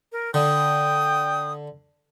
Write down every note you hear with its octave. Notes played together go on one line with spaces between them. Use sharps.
A#4
D3 G5 D#6